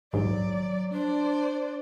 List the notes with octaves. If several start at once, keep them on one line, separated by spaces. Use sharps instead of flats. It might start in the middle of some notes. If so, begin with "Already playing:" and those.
A#1 D#2 G#2 F#3 D5
D4 C5 D5